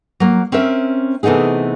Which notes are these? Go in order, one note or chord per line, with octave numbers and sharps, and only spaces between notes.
F#3 A#3
C4 C#4 A#4 E5
C3 E3 A3 B3 D#4 G#4